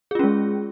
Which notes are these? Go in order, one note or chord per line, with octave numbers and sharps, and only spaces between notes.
G#3 C#4 F4 G#4